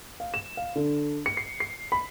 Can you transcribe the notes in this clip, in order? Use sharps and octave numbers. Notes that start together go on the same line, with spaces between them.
F5
E7
F5
D3
C#7
C7
C7
B5